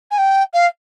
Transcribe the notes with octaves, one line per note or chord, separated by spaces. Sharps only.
G#5
G5
F5